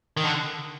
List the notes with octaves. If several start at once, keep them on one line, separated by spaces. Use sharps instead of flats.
D#3
D3